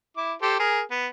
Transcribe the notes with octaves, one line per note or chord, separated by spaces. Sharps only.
E4 D6
G4 A4 C5
G#4 A#4
B3